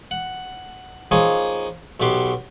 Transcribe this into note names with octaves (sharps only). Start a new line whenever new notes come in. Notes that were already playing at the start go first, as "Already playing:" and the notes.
F#5
F3 A#3 D#4 G#4 C#5 G#5
B1 B2 B3 G4 C6